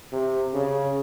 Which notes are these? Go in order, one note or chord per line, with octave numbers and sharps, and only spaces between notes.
C3
C#3